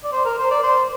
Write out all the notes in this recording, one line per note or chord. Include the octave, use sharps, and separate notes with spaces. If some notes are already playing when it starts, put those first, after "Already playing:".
D5
C5
A#4
C5
D5
C5